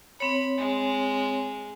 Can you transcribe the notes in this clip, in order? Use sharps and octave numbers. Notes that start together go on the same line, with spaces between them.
C4 C#5 B5
G#3